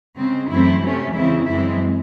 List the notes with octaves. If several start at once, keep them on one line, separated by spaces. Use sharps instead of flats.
C#3 G#3 C4
F#2 E3 A3 C4 E4
C3 F#3 A3 C#4
E2 C#3 G#3 C4 E4
F#2 E3 G#3 C4 E4